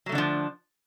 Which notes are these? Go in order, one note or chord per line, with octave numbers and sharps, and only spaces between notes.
D3 F3 F#3 A3 D4